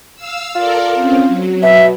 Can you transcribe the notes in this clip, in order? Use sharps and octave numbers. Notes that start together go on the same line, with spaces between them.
F5 E6
F4 A4 A#4 D5
C4 C#4
F#3
B2 E5